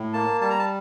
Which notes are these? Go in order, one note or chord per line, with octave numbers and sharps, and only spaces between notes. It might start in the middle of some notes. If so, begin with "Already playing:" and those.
Already playing: A2
A#3 A5
G3 A5
A#5
A5